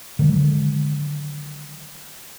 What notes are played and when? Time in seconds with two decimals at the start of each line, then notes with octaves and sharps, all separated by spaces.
0.19 D3 D#3 F#3 G#3